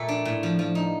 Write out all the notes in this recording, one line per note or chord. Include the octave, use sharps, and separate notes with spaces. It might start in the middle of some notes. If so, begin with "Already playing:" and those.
Already playing: A#2 A3 A4
D4
A2
F3
F3
D#4